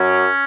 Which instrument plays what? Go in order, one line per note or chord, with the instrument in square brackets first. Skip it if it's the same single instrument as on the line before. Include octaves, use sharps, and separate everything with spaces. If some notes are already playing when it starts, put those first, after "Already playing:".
Already playing: [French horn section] F#2 F#3 [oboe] C#4